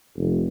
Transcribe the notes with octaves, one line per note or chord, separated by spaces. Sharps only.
F1